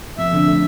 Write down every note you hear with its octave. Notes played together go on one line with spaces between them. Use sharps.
F2 E5
D3
A3